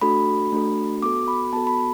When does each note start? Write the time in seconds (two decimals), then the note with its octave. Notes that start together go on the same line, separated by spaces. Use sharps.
0.01 A3 D4 F#4 A4 B5
0.52 A3 D4 F#4 A4
1.02 B3 F#4 A4 D6
1.28 B5
1.53 B3 F#4 A4 A5
1.67 B5